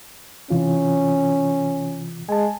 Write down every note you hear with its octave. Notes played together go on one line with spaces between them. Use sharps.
C3 E3 C#4 F4
G#3 G#5 A5